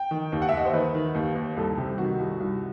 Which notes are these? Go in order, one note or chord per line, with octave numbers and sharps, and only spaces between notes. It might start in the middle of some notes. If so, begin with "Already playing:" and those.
Already playing: G5
D#3
D#2
F#5
E5
D#2
D#5
C5
D#3 B4
D#3
D#2
D#2
C2 A4
C3 G4
D#3 F#4
C2
C2